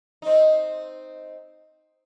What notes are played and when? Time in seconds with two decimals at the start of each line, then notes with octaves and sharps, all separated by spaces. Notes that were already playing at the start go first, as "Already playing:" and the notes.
0.22 C4 D#4